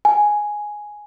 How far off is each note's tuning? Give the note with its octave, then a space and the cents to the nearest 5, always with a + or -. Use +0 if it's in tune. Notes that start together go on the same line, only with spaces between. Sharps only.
G#5 +5